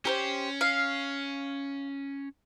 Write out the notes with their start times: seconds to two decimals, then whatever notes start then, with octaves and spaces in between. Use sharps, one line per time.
0.05 C#4 G4 A#4 C5
0.61 F5